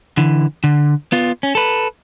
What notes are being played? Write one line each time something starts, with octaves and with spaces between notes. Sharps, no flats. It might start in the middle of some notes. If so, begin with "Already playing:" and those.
D3 E3
D3
B3 F4
C#4
A4 B4